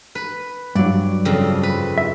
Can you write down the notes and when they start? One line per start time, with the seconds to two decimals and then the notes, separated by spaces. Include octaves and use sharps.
0.15 B4
0.75 G2 F#3 D5
1.25 F2 C#3 C4
1.63 B4
1.98 E5